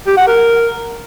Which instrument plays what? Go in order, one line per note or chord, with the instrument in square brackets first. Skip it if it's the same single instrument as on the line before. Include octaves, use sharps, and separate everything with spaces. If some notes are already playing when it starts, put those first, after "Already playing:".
[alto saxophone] G4
F#5
A#4